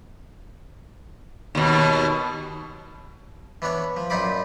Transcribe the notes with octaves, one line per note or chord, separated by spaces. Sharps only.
D#2 B2
E3 B3 D4 C#5
F3
F#2 A#2 D#4 F4 B5 D6